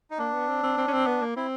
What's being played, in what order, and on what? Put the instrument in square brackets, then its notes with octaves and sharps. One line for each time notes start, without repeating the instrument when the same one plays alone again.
[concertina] D#4
[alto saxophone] A#3 [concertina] D4
[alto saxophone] B3
C4
C4
C4
C#4
C4
B3
A#3
[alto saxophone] C4 [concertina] E4